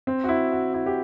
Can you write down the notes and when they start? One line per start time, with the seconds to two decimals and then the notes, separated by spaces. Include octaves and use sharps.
0.07 C4
0.24 F#4
0.29 E4
0.52 F#4
0.74 E4
0.86 G4